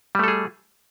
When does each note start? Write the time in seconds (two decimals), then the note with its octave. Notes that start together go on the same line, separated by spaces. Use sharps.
0.15 G3
0.19 A3
0.24 A4
0.28 G#4